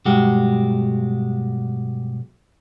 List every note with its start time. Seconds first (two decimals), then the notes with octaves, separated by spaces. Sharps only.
0.05 B1 G2 G#3 F#4 G4